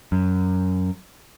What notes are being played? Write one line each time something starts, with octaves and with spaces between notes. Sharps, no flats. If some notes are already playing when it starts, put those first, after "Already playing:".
F#2